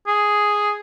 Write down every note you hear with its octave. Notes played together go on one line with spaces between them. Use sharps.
G#4